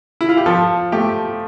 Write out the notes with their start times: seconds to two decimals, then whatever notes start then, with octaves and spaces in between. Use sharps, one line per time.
0.21 E4
0.29 F4
0.37 G4
0.46 F3 A4
0.92 A3 G4